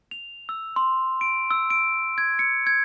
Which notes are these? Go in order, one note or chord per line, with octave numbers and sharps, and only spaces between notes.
F7
E6
C6
D7
E6
D7
G#6
C#7
G#6